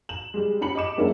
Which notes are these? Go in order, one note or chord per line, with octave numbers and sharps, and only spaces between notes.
E7 F#7
G3 G#3
C#4 G4 B5 C#7 F#7
D#5 B5 D6 E7
F#3 G#3 A#3 C#4 D4 E4